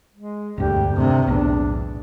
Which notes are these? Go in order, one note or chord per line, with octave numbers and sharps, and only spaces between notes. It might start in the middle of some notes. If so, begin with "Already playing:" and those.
G#3
E1 D2 G2 G4
C3 D#3 D4
B1 E2 A2 D4